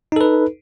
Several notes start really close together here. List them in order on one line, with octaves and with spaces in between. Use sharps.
D#4 A4 B4